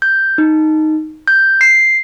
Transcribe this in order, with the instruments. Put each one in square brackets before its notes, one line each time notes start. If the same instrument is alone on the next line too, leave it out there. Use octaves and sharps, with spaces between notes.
[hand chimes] G6
D#4
G6
C7